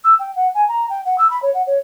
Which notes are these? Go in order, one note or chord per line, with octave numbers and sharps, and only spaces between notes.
E6
G5
F#5
G#5
A#5
G5
F#5
E6
B5
C#5
F#5
C#5